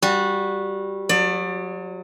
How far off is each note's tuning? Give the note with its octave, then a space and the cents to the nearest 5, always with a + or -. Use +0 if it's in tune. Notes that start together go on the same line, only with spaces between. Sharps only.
G3 +0 F#4 -15
F#3 -30 D5 +20